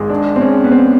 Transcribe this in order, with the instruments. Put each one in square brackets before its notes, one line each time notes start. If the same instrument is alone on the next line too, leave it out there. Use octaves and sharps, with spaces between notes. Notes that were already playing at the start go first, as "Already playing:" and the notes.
Already playing: [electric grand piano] G#1 G#3
[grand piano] D4
C4
C#4
B3
C4